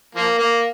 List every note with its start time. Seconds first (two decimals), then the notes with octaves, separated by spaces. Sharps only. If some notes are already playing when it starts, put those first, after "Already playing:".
0.15 F3 A#3
0.39 A#3